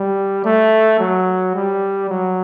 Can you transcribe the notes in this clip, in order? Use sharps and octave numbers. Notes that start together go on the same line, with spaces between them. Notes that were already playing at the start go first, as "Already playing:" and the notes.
Already playing: G3
A3
F#3
G3
F#3